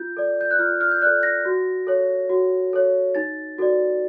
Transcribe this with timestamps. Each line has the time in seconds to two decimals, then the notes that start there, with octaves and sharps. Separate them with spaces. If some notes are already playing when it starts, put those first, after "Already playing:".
Already playing: F4 G6
0.17 A4 D5
0.41 G6
0.51 F#6
0.59 F4 F6
0.81 F6
0.91 G6
1.02 A4 D5 F#6
1.23 A#6
1.45 F#4
1.87 A4 C#5
2.29 F#4
2.73 A4 C#5
3.15 D#4 A6
3.58 F#4 A4 D5